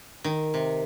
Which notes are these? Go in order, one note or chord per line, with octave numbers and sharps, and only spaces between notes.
D#3
C3